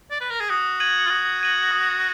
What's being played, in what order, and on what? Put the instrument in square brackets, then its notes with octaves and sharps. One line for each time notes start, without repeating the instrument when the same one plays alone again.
[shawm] D5
B4
A#4
G#4
[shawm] F#4 [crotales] D#6
[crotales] G#6 D#7 F#7
[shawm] F4
[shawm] F#4 [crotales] D#6
[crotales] G#6 D#7 F#7
D#6